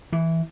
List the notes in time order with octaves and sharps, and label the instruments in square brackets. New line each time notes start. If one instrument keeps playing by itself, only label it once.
[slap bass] E3